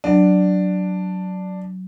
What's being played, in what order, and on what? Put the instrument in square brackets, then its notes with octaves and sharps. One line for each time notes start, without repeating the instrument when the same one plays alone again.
[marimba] F#3 [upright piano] D4